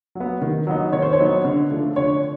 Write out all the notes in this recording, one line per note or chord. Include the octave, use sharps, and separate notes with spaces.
F#3 B3
D#3
F#3 B3 D#4
D#3 C#5
C5
C#5
F#3 B3 D#4
D3
F3 A3 D4
D3 C#5